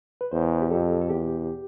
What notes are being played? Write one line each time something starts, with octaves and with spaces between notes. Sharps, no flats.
B4
E2 C5
G4
F2 A4
A4
E2 G4